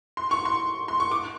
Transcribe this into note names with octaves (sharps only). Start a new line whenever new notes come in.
C6
C#6
C6
C6
C#6
D6